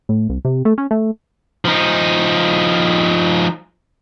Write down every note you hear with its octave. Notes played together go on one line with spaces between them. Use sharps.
A2
C2
C3
A3
C#4
A3
F3 D#4